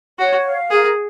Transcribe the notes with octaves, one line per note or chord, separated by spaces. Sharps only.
F#4 C#5
F5
G#4 A#4